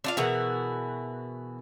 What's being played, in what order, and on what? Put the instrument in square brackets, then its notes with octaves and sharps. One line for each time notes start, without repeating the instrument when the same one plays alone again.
[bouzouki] D4 F4 F5
[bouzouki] B2 E3 F#4 [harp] G#4 A#4 F#5